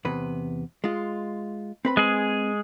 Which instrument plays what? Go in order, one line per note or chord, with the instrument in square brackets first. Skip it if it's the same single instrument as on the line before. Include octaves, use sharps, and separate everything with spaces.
[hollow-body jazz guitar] E2 C3 B4
G#3 F4
C4 B4 B5
[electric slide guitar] G#3 G#4